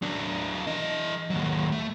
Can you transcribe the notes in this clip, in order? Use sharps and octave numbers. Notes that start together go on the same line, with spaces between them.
F#3 D4
E3 D#5
D#2 F#3
A3